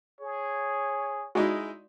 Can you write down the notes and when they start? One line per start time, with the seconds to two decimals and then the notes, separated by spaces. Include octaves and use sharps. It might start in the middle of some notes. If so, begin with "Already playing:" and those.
0.21 G#4 C#5
1.35 G#3 D#4 E4 F#4 D5 D#5